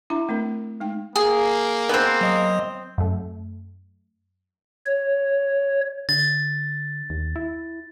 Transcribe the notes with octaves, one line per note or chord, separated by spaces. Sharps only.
D4 E4 E5 A#5
A3 C4 D4 A#4
G#3 D#4 G5
A#3 G#4
B3 C4
F#3 D#5 D#6
F#2 A3
C#5
D3 A6
D#2
E4